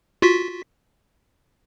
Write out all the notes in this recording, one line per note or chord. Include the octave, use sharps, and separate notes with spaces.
F4 F#4 B6